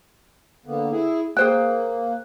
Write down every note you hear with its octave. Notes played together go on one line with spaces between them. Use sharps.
D3 A#3 B3
E4 G#4
A#3 G#4 C5 G5 F#6